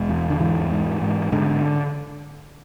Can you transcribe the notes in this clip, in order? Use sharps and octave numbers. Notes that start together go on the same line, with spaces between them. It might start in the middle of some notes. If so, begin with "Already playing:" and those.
Already playing: E1 G#3
E2
D3
G#2 E3
G#2
G#2
G#2 D3